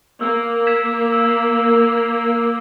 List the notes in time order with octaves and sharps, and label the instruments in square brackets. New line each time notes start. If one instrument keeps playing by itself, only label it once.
[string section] A#3 [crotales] E6
[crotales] G#6 B6 E7
E6